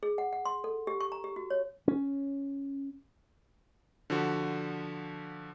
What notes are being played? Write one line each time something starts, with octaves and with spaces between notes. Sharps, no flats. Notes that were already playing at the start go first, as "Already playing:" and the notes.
G#4
F#5
F#5
C6
A4
G4
C#6
A#5
G4
F#4
C#5
C#4
D3 F3 F#4